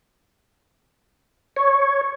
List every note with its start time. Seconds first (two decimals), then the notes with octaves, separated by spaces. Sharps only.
1.56 C#5